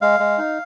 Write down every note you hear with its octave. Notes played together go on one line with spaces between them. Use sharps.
G#3 F5
G#3
D#4